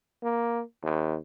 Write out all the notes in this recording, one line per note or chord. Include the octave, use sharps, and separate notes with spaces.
A#3
D#2